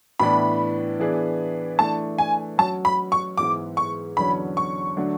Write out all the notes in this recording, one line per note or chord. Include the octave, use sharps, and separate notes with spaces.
A2 E3 B3 D4 B5
E3 B3 D4 G#4 B4
E3 A3 D4 A5
G#5
F#3 C#4 F#4 A5
B5
C#6
G#2 E3 G#3 B3 D6
C#6
E2 D3 F#3 C#4 B5
C#6
D3 F#3 A3 D4